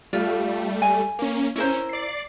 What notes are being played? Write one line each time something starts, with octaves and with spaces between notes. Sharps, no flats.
G3 A3 F4
G#5
A#3 C#4
C#4 E4 A#4 C5
D5 C7